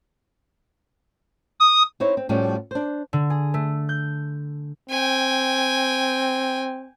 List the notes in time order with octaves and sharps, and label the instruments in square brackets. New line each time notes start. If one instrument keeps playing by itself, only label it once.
[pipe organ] D#6
[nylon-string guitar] C4 D#4 E4 C#5
C4
A2 F3 G3 A3 C#4 F#4
D4 C5
[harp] D3
G#4
A3
G6
[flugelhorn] C4 [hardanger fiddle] G5 G#5